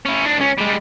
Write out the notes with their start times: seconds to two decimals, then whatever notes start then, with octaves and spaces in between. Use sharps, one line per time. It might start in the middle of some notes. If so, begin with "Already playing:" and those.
0.06 C#4 E4
0.25 D4 D#4
0.38 C#2 C#4
0.58 G3 G#3